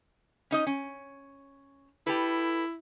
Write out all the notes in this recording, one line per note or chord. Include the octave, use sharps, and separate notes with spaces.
C#4 D#4 D#5
C#4
E4 G4 A4 B4